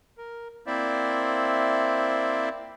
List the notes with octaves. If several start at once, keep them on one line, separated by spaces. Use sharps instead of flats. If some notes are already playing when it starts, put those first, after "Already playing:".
A#4
A#3 C4 E4 C5 D5 E5